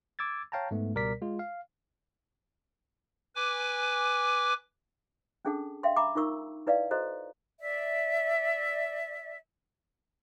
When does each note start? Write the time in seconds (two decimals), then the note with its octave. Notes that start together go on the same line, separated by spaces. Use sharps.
0.19 D6 E6 G#6 A6
0.52 C#5 F5 G5 A5 A#5
0.71 G#2 A3 B3
0.94 C#2 B2 G3 A#4 D5 B6
1.22 G#3 F4
1.39 F5
3.35 B4 G#5 D6
5.45 C#4 D4 G#4 A4 F#5 A5
5.83 E5 F5 G5 C6
5.96 E5 A#5 B5 D6
6.15 D#4 F4 A#4 C#6 E6
6.67 E4 B4 D5 D#5 F5
6.91 F#4 A4 C5 D#5 A#5
7.60 D5 E5